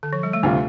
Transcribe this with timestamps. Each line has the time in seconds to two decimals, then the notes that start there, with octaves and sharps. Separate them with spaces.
0.03 D3
0.13 F3
0.23 G3
0.33 A3
0.43 D2 C3 G3 C4 F4